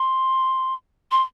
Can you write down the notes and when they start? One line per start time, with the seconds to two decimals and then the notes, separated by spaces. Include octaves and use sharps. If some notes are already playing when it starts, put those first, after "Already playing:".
Already playing: C6
1.11 C6